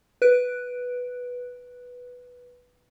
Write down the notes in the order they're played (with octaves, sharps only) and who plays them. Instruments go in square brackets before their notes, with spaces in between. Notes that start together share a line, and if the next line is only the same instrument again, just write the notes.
[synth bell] B4 F#6 D7